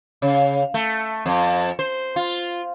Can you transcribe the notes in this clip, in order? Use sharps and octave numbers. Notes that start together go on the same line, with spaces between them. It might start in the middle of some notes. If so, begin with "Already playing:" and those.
C#3
A3
F2
C5
F4